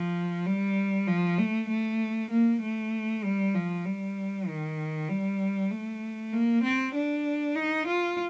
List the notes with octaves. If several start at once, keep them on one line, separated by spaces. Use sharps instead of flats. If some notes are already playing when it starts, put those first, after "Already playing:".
Already playing: F3
G3
F3
A3
A3
A#3
A3
G3
F3
G3
D#3
G3
A3
A#3
C4
D4
D#4
F4